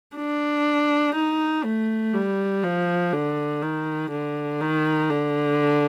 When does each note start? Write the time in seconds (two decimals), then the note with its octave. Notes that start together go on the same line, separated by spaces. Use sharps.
0.16 D4
1.15 D#4
1.65 A3
2.14 G3
2.63 F3
3.13 D3
3.62 D#3
4.11 D3
4.61 D#3
5.10 D3